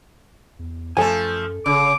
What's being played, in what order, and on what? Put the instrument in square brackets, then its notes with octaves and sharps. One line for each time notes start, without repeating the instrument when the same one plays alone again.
[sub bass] E2
[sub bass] F#2 [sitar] F3 A3 [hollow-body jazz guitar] A4 G#5
[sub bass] F1 [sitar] C#3 [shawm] D6